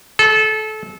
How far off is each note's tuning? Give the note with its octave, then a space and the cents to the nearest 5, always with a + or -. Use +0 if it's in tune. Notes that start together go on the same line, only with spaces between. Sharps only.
A4 -25